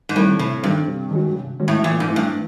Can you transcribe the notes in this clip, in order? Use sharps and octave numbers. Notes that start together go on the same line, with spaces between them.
G#2
A2 D#3 G3 C4
A2 C3
G2 D#3 G3 C4
C3
D#3 G#3 C#4 F#4
C3
D#3 G#3 C#4 F#4
A2
A#2 E3
G#2
A3 C4 E4
G2
E3